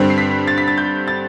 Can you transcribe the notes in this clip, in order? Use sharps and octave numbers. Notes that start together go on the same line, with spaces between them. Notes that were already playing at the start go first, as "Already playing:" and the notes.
Already playing: G2 D3 G3 C4
C7
B6
A6
B6
A6
G6
A6